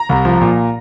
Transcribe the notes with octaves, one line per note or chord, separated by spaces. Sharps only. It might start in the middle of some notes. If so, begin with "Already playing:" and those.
Already playing: A#5
C2
F3
A#2